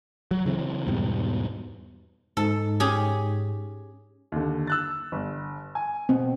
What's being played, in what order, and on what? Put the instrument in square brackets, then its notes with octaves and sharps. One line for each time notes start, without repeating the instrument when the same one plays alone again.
[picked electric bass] F#3
C#3 E3 C4
E2 G#2 B2 G3
[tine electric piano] G#2 [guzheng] A4
[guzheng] C#4 G4 G#4
[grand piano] D#2 D3
E6 F#6 A6
G1
G#5
[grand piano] B2 [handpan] C4